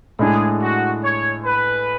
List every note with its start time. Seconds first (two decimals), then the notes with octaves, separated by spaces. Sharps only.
0.19 A2 G#3 D4 G#4
0.61 F#4
1.03 C#5
1.45 B4